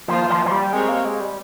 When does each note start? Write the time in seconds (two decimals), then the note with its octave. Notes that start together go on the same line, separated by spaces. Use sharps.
0.08 D#3 F3 A#3 F4 C5
0.30 F3
0.46 F3
0.51 G3
0.73 G#3 C4 G4 A#4 C#5
0.89 A#3
1.05 G#3
1.21 G3